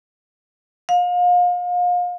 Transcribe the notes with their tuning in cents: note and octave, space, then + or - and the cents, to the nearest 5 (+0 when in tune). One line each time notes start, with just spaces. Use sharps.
F5 +35